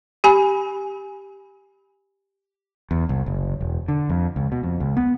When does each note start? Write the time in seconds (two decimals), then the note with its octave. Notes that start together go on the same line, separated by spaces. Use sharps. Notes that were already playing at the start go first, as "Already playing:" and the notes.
0.24 G4 G#5 B5
2.91 E2
3.09 C2
3.26 F#1
3.61 E1
3.88 D3
4.10 F2
4.36 C#2
4.52 B2
4.63 F2
4.80 C#2
4.97 B3